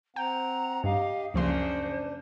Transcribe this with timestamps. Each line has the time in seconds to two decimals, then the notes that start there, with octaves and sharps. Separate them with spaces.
0.16 C4 F#5 G5 A#5
0.84 G2 G4 D#5 F5
1.34 C#2 F#2 C#3 F3 A#3 D4 C5 C6